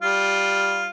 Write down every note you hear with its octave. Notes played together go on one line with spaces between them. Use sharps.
G3 F4